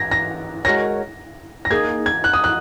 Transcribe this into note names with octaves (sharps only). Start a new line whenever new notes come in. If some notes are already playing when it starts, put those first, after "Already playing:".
Already playing: G#6 A#6
A#6
G#3 F#4 A#4 C#5 A#6
A#6
A#3 D#4 G#4 G#6
G#6
F#6
D#6
F#6